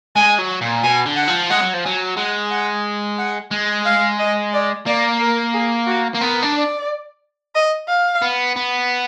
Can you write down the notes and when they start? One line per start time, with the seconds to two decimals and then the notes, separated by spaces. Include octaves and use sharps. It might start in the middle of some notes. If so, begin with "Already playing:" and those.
0.16 G#3 G#5
0.38 F#3
0.61 A#2
0.83 B2 G#5
1.06 D3
1.16 F#5
1.27 F3
1.50 G#3 F#5
1.62 F#3
1.74 F3
1.84 F#3 G#5
2.17 G#3 F#5
2.51 F#5
3.18 F#5
3.51 G#3
3.85 F5
4.19 D#5
4.53 D5
4.86 A#3 D5
5.20 A#4
5.53 G#4
5.87 F#4
6.14 A#3
6.20 B3 A#4
6.42 D4
6.55 D5
7.55 D#5
7.88 F5
8.22 B3
8.56 B3